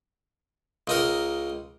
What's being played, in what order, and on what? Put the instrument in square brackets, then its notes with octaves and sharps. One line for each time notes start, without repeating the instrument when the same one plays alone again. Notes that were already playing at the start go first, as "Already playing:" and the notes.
[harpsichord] C#2 D#4 A#4